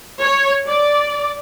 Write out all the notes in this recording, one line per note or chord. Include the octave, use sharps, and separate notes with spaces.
C#5
D5